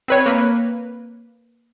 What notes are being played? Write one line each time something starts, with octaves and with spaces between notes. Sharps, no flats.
C4 B4 C#5
A#3 B4